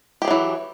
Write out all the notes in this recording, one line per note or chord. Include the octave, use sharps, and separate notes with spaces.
E3 F#3 G4 G#4